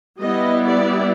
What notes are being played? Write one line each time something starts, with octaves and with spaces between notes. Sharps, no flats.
G3 B3 E4 D#5
D5